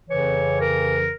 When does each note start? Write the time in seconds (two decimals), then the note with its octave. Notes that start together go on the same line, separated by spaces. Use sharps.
0.08 F2 C#3 E3 C#5
0.60 A#4